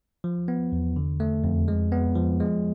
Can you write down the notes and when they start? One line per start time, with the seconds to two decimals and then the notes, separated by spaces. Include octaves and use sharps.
0.24 F3
0.48 B3
0.72 E2
0.96 D3
1.20 A3
1.44 F2
1.68 G#3
1.92 B3
2.15 F3
2.40 G#3